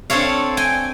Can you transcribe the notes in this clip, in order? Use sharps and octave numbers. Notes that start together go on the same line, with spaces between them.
C4 D4 A4 C#5 F5
G5 G#5